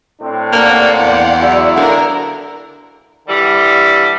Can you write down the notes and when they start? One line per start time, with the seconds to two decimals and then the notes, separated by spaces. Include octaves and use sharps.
0.21 A2 C4 D4
0.53 A#3 D5 F5 F#5
1.00 E2
1.41 F#3 G#3 E4
1.77 D3 A#4
3.28 D3 E3 G3